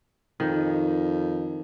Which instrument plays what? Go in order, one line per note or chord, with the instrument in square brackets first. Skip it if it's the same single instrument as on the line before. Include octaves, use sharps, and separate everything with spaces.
[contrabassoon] F2 [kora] D#3